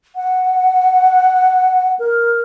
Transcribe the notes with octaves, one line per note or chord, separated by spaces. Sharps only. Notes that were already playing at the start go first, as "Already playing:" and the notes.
F#5
A#4